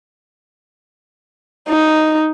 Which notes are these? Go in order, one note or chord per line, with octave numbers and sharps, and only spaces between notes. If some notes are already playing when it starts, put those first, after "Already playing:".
D#4